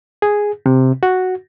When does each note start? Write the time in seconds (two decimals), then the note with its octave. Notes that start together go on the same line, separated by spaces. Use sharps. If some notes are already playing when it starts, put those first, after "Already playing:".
0.22 G#4
0.66 C3
1.03 F#4